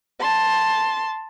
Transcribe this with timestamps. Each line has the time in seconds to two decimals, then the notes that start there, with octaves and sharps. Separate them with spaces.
0.19 A5 C6